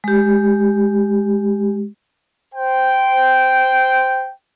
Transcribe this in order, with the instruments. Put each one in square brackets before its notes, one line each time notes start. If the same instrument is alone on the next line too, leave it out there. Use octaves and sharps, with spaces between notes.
[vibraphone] G#3 G4
[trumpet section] C5 G5